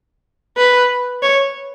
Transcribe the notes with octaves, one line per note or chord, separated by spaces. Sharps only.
B4
C#5